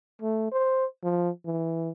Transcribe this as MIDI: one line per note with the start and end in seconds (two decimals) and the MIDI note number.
0.22 0.51 57
0.52 0.86 72
1.04 1.30 53
1.45 1.90 52